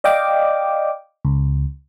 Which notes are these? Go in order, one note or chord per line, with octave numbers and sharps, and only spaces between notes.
D5 D#5 F5 G5 D6
C#2